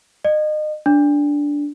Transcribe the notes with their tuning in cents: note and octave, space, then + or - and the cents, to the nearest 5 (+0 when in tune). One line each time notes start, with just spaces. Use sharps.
D#5 -30
D4 -10